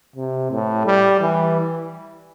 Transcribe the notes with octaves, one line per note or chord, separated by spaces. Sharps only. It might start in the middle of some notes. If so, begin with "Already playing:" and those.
C3
A2
G3
E3